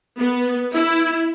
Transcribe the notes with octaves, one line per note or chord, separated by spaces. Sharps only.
B3
E4